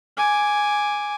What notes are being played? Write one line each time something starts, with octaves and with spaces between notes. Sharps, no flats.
G#5 D6